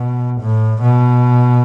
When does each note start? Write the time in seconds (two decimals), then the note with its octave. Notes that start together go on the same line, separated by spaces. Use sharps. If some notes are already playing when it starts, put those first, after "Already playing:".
Already playing: B2
0.42 A2
0.82 B2